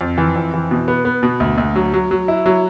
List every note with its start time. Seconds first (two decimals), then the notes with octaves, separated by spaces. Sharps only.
0.01 F2
0.18 E3
0.36 F2
0.54 E3
0.71 B2
0.88 B3
1.05 B3
1.23 B2
1.40 D2
1.58 D2
1.76 F#3
1.93 F#3
2.11 F#3
2.28 E4
2.46 F#3